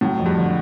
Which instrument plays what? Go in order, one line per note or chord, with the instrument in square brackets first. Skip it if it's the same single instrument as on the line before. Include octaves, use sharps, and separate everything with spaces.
[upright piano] A2 [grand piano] F#3
[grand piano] F2
[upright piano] G2
[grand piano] D3